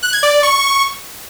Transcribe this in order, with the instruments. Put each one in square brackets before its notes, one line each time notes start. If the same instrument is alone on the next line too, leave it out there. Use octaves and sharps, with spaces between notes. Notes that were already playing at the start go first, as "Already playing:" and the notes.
[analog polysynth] F#6
G#6
D5
D5
C#6